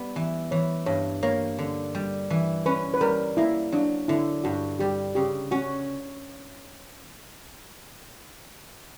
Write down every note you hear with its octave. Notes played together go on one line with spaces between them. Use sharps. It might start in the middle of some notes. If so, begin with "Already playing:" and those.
Already playing: G3 B3
E3
E3 C#5
G2 C#5
A#3 C#5
D3
G3
E3
C#4 B4
B4
G3 A#4
A#3 E4
F#3 D4
D3 E4
G2 F#4
G3 G4
C#3 G4
C#4 F#4